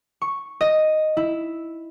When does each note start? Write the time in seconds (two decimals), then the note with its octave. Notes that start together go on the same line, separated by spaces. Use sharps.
0.22 C#6
0.61 D#5
1.17 E4